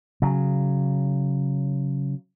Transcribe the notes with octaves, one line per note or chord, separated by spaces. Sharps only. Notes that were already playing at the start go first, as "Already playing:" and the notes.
C#3 F#3